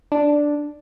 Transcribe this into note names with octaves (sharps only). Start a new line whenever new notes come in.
D4